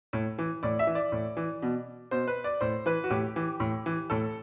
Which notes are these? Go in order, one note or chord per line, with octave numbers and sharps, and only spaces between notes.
A2
E3
A2 D5
E5
E3
D5
A2
E3
B2
B2 C5
B4
D5
A2 C5
E3 B4
F#4
A2 G4
E3
A2
E3
A2 A4